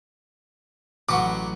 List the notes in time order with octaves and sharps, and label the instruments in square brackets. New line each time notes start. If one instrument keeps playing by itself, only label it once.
[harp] A1 [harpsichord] F#3 F#4 B4 [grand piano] F#5 C#6 D6